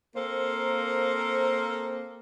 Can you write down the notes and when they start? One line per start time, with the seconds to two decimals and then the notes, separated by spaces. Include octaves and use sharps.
0.15 A#3 C4 A4 A#4 C5